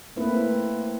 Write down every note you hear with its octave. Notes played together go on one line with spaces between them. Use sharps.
A3 A#3 C4 E4 B4